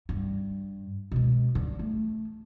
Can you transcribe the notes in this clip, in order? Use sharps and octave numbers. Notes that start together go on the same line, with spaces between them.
G2
B2 G#3
D3
A3